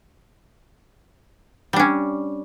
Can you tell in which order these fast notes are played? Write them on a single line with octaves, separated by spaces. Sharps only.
G3 D4 C#4